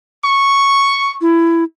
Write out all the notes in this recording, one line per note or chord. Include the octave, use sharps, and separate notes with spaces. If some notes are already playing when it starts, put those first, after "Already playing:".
C#6
E4